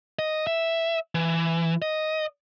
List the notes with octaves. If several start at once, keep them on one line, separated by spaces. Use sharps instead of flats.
D#5
E5
E3
D#5